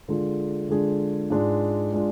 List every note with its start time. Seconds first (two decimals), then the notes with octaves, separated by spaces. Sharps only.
0.08 D3 G#3 D4 F4 G#4
0.69 D3 G#3 D4 F4 G#4
1.30 G#2 G#3 D4 F4
1.93 G#3 D4 F4